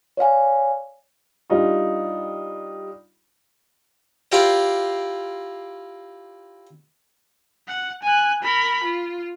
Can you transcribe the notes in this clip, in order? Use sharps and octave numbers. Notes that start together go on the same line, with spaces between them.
C#5 D5 F5 G#5
G3 D4 D#4 F4
E4 F4 G4 A#4 C5 D5
F#5
G#5 F#6
A#4 B5
F4